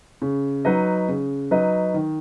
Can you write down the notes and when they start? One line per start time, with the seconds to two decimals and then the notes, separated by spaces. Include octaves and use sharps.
0.22 C#3
0.65 F#3 D#4 B4 D#5
1.08 C#3
1.51 F#3 D#4 B4 D#5
1.94 D#3